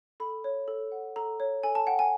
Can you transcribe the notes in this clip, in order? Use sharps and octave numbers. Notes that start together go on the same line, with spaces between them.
A4 B5
C#5
A4
F#5
A4 A#5
C#5
A4 G#5
A5
F#5 G5
G#5